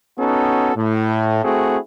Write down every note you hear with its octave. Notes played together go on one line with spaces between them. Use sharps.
B3 C#4 D#4 F#4 A4
A2
A3 C4 E4 F#4 G#4